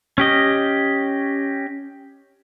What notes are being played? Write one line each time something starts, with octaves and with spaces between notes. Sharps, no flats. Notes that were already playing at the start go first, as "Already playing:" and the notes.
C#4 G4 D#5